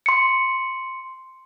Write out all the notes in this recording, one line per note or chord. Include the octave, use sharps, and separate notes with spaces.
C6 C#7